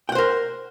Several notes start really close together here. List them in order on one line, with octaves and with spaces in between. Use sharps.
G5 F#5 C5 A#4